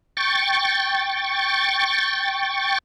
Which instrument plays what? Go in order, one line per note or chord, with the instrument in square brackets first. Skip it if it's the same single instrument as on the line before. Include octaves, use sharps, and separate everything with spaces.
[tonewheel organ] G5 C#6 A6